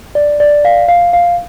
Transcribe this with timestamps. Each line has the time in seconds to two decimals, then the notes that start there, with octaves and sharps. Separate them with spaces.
0.15 D5
0.40 D5
0.65 F5
0.88 F5
1.13 F5